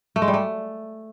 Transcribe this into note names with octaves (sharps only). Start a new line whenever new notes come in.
A3
G#3
G3
A3